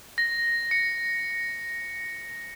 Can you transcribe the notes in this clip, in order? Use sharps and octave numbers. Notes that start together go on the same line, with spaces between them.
A#6
C#7